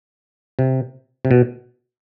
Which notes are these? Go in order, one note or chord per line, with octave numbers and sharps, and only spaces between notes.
C3
C3
B2